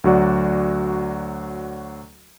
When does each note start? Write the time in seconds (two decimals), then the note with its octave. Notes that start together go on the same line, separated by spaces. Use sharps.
0.04 D2 F#3 F#4 D5